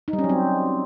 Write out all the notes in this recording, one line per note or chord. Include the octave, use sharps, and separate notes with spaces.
D#4
G3
C#4
F#3
C4